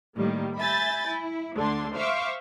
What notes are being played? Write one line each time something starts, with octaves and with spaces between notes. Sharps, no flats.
A2 D#3 G3 A#3
E5 G#5 B5 G6 A6
E4
D2 D3 D4 C6
C5 E5 F5 C#6 D6